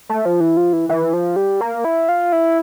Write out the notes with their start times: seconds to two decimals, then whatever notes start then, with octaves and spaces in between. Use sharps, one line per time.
0.09 A3
0.26 F3
0.40 E3
0.57 F3
0.73 E3
0.89 E3
1.13 F3
1.36 G3
1.61 A#3
1.85 E4
2.09 F4
2.32 E4